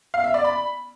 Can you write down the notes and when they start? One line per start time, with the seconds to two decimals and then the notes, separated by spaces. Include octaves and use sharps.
0.14 F5
0.24 E5
0.34 D5
0.44 B5